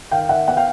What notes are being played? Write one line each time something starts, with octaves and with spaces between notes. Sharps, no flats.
D#3 F5 G5
D#3 E5 F#5
B3 F#5
F5 G5